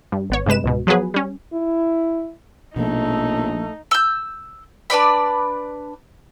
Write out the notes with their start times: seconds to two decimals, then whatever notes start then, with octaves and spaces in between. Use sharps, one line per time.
0.12 G2
0.30 G#1 B3 C#5
0.46 G2 C3 G#3 B4 E7
0.64 C#2 G#2 B2
0.87 F3 F#3 B3 G#4 B4
1.14 G3 C#4
1.53 E4
2.76 A#1 B2 F3 A3 D#4
3.91 E6 G6
4.90 D4 B4 D5 B5